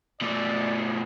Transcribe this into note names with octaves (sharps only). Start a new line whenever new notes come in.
B2 A3 D5